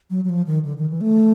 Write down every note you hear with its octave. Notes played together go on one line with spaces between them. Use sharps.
F#3
F#3
F3
D#3
D3
D#3
E3
A3